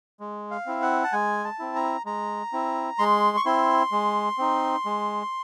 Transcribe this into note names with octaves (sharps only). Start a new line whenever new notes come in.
G#3
F5
C4 E4
F#5
A5
G#3 G#5
A5
C4 E4
A#5
G#3 A#5
C4 E4
G#3 C6
C#6
C4 E4 C6
G#3
C4 D#4
G#3